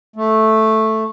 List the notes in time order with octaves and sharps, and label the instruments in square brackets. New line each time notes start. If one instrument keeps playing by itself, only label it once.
[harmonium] A3